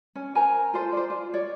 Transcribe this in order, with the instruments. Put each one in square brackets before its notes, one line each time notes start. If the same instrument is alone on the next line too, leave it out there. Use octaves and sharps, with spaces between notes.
[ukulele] C#4
A#4 C5 G#5 A#5
F4 A4 C5
C5 D5
F4
C#5 D5